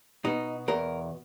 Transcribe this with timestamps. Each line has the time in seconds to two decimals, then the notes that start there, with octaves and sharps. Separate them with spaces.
0.25 B2 D#4
0.68 E2 A#4